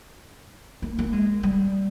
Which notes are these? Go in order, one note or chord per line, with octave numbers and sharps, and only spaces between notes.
A#3
A#3
G#3
G3